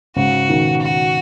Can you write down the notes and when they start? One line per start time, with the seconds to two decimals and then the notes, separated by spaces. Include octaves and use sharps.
0.16 G#2 C#3 F#4
0.48 B2 D#3
0.81 F#4